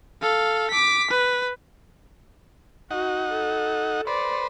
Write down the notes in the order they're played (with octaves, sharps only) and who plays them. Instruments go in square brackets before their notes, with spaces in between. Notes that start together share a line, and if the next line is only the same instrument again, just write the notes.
[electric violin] A4 F5
D6 B6
B4
[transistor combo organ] D#4 F#5 [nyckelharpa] F#4
[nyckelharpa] A4
[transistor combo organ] B4 C5 [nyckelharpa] D5